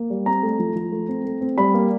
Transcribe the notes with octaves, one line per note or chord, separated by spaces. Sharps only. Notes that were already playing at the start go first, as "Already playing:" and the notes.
Already playing: A#3
G3
C4 A#5
A3
F3
F3
A3
C4
A3
C4
G3 B5
A#3